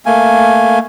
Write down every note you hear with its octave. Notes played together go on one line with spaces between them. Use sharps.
A3 A#3 G#5